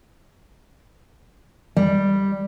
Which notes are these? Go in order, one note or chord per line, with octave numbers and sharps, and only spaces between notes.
G3